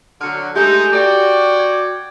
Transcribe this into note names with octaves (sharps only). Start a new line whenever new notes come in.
D3 F#3 F6 C#7
G#3 A3 D#4 G4 G6
F#4 D5 G5
G#6